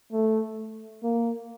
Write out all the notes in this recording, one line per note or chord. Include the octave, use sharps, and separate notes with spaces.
A3
A#3